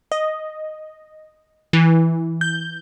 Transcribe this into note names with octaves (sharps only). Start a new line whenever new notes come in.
D#5
E3
G6